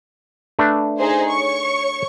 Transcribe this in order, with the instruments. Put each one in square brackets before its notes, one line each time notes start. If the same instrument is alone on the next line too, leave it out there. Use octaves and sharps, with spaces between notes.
[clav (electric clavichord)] A3 D4 B4
[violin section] D#4 G#4 C5
C#5 C#6